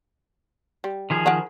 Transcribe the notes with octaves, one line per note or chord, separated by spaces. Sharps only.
G3
D#3 F3 G#4
A#4 F#5 B5